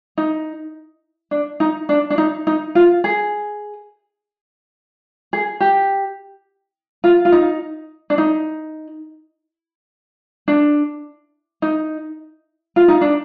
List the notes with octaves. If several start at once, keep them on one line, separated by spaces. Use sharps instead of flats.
D#4
D4
D#4
D4
D4
D#4
D#4
F4
G#4
G#4
G4
F4
F4
D#4
D4
D#4
D4
D#4
F4
D#4
D4